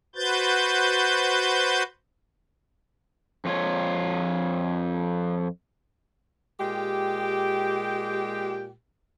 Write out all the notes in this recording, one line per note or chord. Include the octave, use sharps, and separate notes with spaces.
F#4 B4 C5 G6 A6
F2 F4 C#5
A#2 G#3 G4